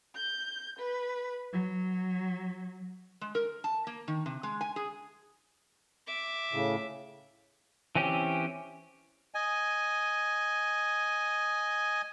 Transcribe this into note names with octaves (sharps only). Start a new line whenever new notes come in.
G6
B4
F#3
G#3
A#4
A5
A#3
D#3
C3
G#3
G#5
G#4
E5 D6
A2 C#3
E3 C4 C#4 G4
D#5 G#5